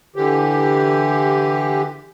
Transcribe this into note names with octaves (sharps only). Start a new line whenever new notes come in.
D3 E3 G4